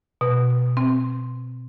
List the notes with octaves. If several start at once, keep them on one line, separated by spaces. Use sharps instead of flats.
B2
C4